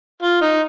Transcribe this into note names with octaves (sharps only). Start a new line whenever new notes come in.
F4
D#4